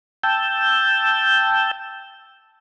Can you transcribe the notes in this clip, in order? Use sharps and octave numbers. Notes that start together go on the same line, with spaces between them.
G5 A5 E6 G6